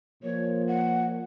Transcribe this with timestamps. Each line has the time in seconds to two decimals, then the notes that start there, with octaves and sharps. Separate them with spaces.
0.23 A#2 F3 C#5
0.67 F#5